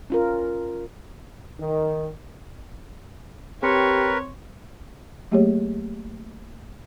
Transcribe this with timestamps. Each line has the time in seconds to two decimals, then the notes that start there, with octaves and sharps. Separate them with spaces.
0.10 C#4 F4 A#4
1.60 D#3
3.63 C4 G4 A#4 B4 C#5 C6 C#7
5.31 F#3 A3 A#3 G4 G#4 C#5